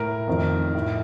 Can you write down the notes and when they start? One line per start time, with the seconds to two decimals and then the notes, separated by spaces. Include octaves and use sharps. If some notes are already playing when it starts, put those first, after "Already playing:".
Already playing: A2 A#4
0.28 F2 D#3
0.74 A2